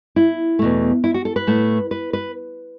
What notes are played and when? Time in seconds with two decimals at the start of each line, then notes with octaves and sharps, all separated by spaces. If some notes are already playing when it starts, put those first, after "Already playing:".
0.16 E4
0.59 E2 B2 A3
1.04 E4
1.14 F#4
1.25 A4
1.36 B4
1.47 A2 A3
1.91 B4
2.13 B4